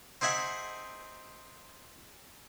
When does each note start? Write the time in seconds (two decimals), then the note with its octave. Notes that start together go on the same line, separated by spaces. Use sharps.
0.21 C4 D#4 G#4 E5 F#5